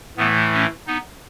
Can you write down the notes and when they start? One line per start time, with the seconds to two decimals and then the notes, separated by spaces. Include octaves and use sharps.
0.17 A2 E3 A3 B3
0.53 C#4
0.87 B3 D#4